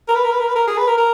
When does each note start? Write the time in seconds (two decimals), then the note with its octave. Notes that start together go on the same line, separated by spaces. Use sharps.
0.08 A#4
0.15 B4
0.24 A#4
0.32 B4
0.40 A#4
0.48 B4
0.56 A#4
0.68 G#4
0.78 B4
0.88 A#4
0.98 A#4